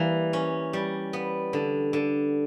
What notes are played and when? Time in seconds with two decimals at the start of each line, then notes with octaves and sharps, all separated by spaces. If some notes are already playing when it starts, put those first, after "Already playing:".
Already playing: E3 G3 A#3
0.33 C#4
0.73 G3
1.13 B3
1.53 D3
1.93 D3